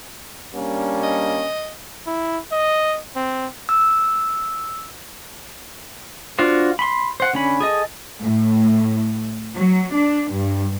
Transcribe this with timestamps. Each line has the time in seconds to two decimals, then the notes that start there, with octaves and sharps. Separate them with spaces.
0.55 G3 A#3 C#4 D4
1.03 D#5
2.07 E4
2.52 D#5
3.16 C4
3.69 E6
6.39 D4 F4 F#4 C5
6.79 B5 C6
7.20 C5 F#5
7.33 D3 C#4 B5
7.60 G#4 A4 D#5
8.21 A2
9.55 F#3
9.94 D4
10.32 G2